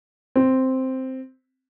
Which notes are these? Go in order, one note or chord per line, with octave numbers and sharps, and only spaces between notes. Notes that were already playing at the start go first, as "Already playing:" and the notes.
C4